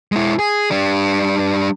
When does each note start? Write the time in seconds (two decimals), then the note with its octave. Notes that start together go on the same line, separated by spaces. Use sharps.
0.12 G#3 E4
0.39 G#4
0.71 G3 D4